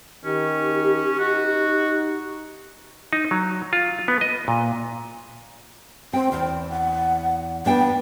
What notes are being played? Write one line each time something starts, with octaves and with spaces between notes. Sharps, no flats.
D#3 C#4 G4
D#4 F#4
D#4
F#3
F4
B3
D#5
A#2
C4 G5
E2 G5
F#5
B3 D4 G5